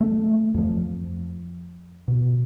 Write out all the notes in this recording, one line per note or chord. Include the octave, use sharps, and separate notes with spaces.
A3
F2 F3
B2